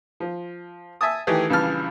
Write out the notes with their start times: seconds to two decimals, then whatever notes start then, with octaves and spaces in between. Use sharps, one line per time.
0.20 F3
1.01 E5 G#5 A5 D#6
1.27 D#3 E3 A3 G4 G#4
1.50 A#1 C#3 E3 G3 A5 F6